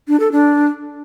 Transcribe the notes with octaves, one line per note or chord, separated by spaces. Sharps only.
D4
A4
D4